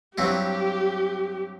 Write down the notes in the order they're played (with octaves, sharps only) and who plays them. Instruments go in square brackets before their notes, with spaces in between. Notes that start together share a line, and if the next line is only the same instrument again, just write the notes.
[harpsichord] G2 F#3 C4 E4 [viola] G4